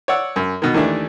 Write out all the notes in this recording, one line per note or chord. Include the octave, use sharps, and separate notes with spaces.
C#5 D5 F#5 E6
F#2
B2 D#3
D#2 D#3 E3 A3 D4